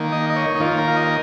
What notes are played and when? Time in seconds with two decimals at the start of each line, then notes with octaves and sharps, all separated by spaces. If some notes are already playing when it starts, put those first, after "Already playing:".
Already playing: D#3 A#3
0.12 D#5
0.30 D#5
0.36 C#5
0.55 D#4
0.60 D#3 A#3 F4
0.78 A#4
0.88 F5
0.97 D#5